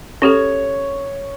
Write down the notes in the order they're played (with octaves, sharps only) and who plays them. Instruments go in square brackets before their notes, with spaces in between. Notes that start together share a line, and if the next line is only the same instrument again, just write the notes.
[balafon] C#4 G4 A4 [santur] C#5